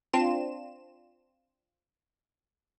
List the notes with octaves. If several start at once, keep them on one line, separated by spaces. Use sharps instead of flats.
C4 D4 F4 E7